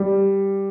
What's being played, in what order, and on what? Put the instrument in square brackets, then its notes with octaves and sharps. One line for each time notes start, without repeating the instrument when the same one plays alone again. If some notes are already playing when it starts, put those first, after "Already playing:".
Already playing: [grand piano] G3